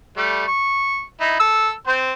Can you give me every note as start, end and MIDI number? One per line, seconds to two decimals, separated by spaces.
0.17 0.44 55
0.17 0.44 57
0.47 1.03 85
1.20 1.37 63
1.20 1.37 64
1.40 1.71 69
1.40 1.71 88
1.87 2.13 60
1.87 2.13 72